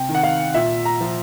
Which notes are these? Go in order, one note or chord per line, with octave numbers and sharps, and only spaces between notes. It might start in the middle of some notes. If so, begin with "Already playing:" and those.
Already playing: C3 G5
D#3
F#5
F5
A#2 E5
A#5
F3